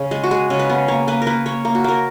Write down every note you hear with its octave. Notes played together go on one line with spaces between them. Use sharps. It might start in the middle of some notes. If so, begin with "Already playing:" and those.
Already playing: C#3
G#3
F#4
G#3 G#4
C#3
B4
B3
A#3 C#5
A#3 B4
A#4
A#3 B4
A#3 C#5
A#3
F#4
A#3 A#4